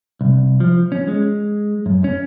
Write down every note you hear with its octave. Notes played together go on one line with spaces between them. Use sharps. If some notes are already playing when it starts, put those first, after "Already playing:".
C2
F3
C#4
G#3
F#2
C#4